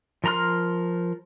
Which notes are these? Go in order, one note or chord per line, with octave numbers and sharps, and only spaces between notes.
F3 A#4 A#5 C6 F6